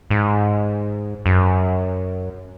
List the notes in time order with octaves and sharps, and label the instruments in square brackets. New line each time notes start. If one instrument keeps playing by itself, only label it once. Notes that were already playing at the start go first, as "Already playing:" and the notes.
[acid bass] G#2
F#2